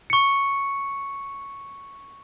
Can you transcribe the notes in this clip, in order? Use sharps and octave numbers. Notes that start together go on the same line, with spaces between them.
C#6 C#7